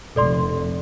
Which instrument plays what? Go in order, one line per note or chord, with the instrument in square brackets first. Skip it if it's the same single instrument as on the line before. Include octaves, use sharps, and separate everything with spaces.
[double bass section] F1 [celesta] A4 D5 C6